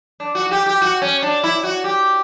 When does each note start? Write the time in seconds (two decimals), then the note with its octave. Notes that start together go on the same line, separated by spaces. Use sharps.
0.20 D4
0.35 F#4
0.46 F#4
0.51 G4
0.66 G4
0.82 F#4
1.02 C#4
1.22 D4
1.44 E4
1.63 F#4
1.84 G4